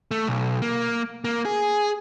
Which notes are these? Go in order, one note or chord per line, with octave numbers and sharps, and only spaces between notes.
A3
B1
A#3
A#3
G#4